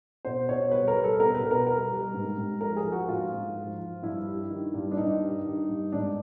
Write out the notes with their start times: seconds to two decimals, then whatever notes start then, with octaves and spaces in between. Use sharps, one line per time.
0.25 B2 C5
0.49 B2 C#5
0.71 G3 B4
0.88 A#4
0.95 G3
1.04 A4
1.20 B2 A#4
1.35 B4
1.42 B2
1.51 A#4
1.66 G3 A#4
1.91 G3
2.14 G#2
2.38 G#2
2.61 F3 A#4
2.76 G#4
2.85 F3
2.92 F#4
3.09 G#2 F4
3.32 G#2
3.56 F3
3.79 F3
4.03 G2 E4
4.27 G3
4.50 D#3
4.74 G2
4.92 D4
4.97 G2 D#4
5.22 G3
5.45 D#3
5.69 G2
5.92 G#2 D4